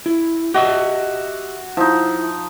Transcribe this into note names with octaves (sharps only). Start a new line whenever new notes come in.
E4
F#4 G4 D#5 E5
F3 D#4 E4